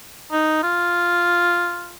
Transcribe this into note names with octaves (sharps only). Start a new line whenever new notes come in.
D#4
F4